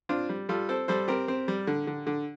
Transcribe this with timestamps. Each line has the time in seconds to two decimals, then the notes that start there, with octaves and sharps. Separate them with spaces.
0.09 C4 D4 F4
0.29 G3
0.49 G3 F4 A4
0.69 C4 A4 C5
0.88 G3 A4 C5
1.08 C4 G4 A#4
1.28 C4
1.48 G3
1.67 D3
1.87 D3
2.07 D3